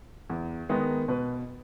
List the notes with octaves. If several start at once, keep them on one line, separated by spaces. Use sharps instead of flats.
E2
D#3 G#3 B3 D#4
B2 B4